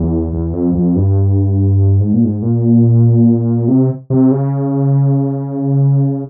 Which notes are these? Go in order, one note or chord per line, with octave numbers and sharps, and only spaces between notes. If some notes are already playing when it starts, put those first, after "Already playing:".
Already playing: E2
E2
F2
F2
G2
G#2
A#2
G#2
A#2
C3
C3
C#3